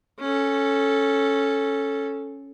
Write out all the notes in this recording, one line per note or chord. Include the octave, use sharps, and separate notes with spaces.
C#4 A4